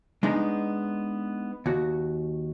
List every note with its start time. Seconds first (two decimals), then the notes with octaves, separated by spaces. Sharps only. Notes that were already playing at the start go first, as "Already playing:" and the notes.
0.23 G#3 B3 D4 D#4
1.66 D#2 F#4